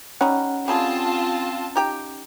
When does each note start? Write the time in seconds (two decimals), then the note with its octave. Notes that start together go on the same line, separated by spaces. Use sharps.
0.21 G3 C#4 D#4 F#5
0.68 G3 A3 C4 F4 G#4 A5
1.76 D#4 G4 G5